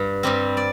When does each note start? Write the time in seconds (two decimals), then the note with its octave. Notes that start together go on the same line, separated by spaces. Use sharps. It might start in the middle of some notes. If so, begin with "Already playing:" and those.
Already playing: G2
0.23 G2 G3 C4
0.57 D5